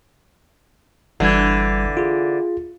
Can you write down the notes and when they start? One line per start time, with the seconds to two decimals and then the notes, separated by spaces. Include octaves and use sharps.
1.20 G1 D3 E3 G3 G#6
1.97 F4 G#4